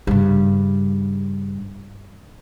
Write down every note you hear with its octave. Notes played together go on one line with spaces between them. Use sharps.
G2 C#3